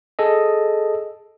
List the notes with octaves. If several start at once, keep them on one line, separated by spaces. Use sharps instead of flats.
G#4 A4 D#5